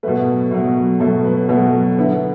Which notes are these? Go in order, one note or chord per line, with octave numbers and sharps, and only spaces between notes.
B2 F#3 A3 B4
B2 F#3 A3
B2 F#3 A3 A4
B4
B2 F#3 A3 B4
D3 B3 E4